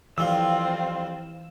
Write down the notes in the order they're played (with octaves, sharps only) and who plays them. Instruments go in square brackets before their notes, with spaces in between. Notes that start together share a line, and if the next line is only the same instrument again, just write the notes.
[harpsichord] F2 G3 [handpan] E3 F5 [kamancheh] C4 F4 [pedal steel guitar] E6